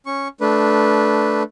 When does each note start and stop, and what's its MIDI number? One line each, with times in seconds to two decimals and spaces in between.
0.06 0.28 61
0.06 0.28 85
0.41 1.43 57
0.41 1.43 62
0.41 1.43 71